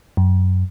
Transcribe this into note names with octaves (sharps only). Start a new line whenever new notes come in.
F#2